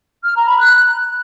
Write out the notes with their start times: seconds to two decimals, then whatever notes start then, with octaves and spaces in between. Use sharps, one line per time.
0.23 F6
0.35 A#5
0.47 B5
0.59 F#6